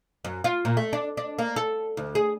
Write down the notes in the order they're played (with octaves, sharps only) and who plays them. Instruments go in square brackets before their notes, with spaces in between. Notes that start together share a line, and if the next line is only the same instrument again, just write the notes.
[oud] F#2
F4
A#2
A3
D4
D4
A#3
A4
D2
G#4